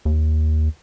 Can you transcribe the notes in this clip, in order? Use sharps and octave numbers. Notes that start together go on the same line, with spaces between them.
D#2